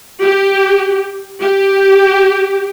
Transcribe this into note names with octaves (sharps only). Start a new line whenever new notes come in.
G4
G4